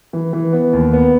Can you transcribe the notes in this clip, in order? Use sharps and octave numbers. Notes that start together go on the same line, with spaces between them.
E3
E3
B3
D#2
B3